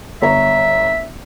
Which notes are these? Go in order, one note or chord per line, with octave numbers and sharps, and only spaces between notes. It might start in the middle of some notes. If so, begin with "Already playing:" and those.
G1 C#5 E5 A#5